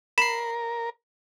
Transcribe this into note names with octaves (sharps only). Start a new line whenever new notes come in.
A#4 B5 C7 E7